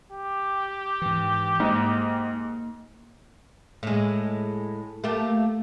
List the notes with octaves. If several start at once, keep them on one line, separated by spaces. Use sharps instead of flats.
G4
G#2 E3
G#2 A#3 D#5
A2 G#3
A3 A#3 G4